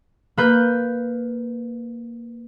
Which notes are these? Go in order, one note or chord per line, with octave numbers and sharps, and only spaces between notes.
A#3 B4 G6